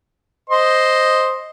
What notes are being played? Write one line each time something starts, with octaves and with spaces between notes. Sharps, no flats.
C5 D#5 C6